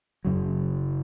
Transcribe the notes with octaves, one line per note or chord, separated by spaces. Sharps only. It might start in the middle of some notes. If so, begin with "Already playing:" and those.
F#1 F#2 C#3 F#3